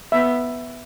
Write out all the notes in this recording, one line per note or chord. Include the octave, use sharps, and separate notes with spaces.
B3 E5